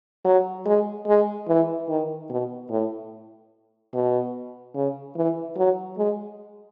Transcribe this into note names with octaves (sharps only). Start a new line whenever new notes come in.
F#3
G#3
G#3
E3
D#3
B2
A2
B2
C#3
E3
F#3
G#3